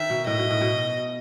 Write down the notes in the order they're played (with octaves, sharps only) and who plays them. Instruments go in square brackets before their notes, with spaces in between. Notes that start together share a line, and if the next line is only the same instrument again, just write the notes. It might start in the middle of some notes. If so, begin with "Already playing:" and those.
Already playing: [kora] D#3 [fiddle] E5
[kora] B2
[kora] A2 [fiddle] D#5
[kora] B2
A2
B2